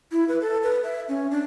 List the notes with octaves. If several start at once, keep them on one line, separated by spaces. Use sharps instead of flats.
E4
B4
A4
B4
E5
C#4
D4